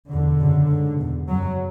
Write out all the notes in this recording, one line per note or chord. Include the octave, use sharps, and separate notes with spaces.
E2 B2 D3
F#2 C#3
G#2
E2 B2
F#2 C#3 F#3